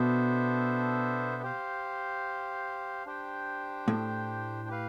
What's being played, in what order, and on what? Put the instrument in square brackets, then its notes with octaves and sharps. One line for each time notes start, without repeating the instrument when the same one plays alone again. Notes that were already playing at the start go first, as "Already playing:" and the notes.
Already playing: [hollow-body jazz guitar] B2 [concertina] B3 D4 A4 C5 E5
[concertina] G4 C5 F5
D4 G4 C5 G5
[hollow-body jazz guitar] A2
[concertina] G4 B4 F5